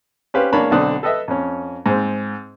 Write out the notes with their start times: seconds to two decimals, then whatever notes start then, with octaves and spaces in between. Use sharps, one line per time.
0.34 C#4 G4 B4 C5 F5
0.53 E2 A#3 D4 C#5 A5 B5
0.71 B1 D3 C4 D4 D#6 F#6
1.03 A4 B4 D#5 E5
1.28 F2 C#4
1.86 G#2 C4